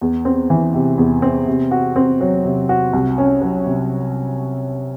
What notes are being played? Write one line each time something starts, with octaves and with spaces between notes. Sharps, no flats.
E2
C4
E3
C3
E2
C4
C3
F#4
C4
F#3
C3
F#4
C2
C#4
F#3
C3